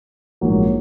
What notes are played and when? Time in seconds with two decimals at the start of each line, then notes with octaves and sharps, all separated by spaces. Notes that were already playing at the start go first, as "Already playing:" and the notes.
0.41 A#1 G#2 F#3 A#3